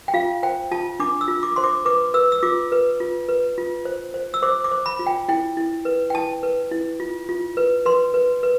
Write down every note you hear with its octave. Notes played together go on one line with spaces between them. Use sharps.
G5
F4 F5
C5 G5
F4 A5
D4 D6
E6
F4
D6
C5 C6
D6
B4 D6
B4 E6
E6
F4 D6
B4
F4
B4
F4
C5
C5
E6
C5 D6
D6
C5
B5
F4
G5
E4 G5
E4
B4
G5
E4 A5
B4
E4
F4
F4
B4
B4 C6
B4
B4